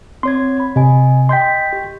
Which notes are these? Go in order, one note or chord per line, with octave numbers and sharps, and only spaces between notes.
C4 C#5 C6 G#6
B5
C3 D#5 G#5
D#5 G5 C6 G6 B6
G4